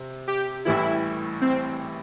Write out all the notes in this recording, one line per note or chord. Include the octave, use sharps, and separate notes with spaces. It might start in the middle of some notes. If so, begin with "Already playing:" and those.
Already playing: C3
G4
A1 A2 E3 G3 E4
C4